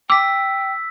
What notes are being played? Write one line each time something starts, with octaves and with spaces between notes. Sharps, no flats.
G5 D6 E6 B6